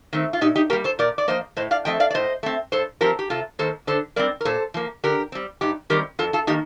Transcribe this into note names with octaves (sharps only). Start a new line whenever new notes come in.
D#3 A3 C4
F4
A#2 D#4 G4
D#4 G4
G3 A#3 G4 A#4
A4 C5
A#2 A#4 D5
D5
F3 A#3 C5 D#5
A2 C5 D#5
D5 F5
F3 A3 C4 D#5 G5
D5 F5
D5
A2 C5 D#5
A3 C4
G2 A4 C5
F3 C4 G4 A#4
G4
C3 F4 A4
D#3 A#3 A4 C5
D3 A4 C5
G3 C4 A#4 D5
A#4
A#2 A4 C5
F3 A#3
D3 G4 A#4
G3 C4
G2 D#4 G4
D#3 G3 C4 G4 A#4
F2 F4 A4
F4 A4
D#3 A#3 D#4 G4